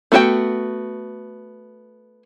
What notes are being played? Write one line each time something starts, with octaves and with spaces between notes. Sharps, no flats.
A3 B3 F#4 D5 G5